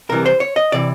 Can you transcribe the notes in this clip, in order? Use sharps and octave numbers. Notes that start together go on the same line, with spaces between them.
C2 C3 E3 G3 A#4
C5
C#5
D#5
C3 E3 D5